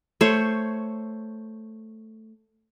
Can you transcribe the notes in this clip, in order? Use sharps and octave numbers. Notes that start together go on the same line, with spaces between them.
A3 C5 C#5